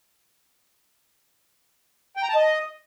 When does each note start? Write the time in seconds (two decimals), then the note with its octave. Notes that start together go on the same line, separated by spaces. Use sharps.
2.17 G5
2.23 A#5
2.29 A5
2.36 D#5